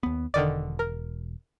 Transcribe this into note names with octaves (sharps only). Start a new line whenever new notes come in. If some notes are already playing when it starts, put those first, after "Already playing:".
D#2 B3
E1 D3 D#3 D5
A#4